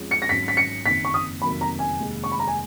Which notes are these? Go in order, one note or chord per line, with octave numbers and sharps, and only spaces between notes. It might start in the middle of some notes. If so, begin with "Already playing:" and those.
Already playing: F2 F3 G#3 C#4 G#4
C#7
A#6
G#1 G#2 F#3 C#4 B6
B6
C#7
F#1 F2 D#3 A#3 B6
C#6
D#6
F1 F2 D#3 F#3 A#3 B5
A#5
G#5
F1 D#2 D#3 G#3
C#6
B5
A#5
G#5